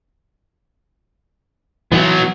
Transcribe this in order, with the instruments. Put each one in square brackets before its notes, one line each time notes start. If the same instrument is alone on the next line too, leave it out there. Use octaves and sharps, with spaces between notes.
[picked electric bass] E3 [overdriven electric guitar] F#3 B3